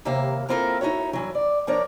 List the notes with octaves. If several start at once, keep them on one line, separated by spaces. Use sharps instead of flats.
D#2 C3 E3 A#3 E5 F5
A#3 C4 E4 F4 A4 A#4
D#4 E4 F#4 C#5
G2 E3 F#3
D5
F3 D4 A#4 C#5 D5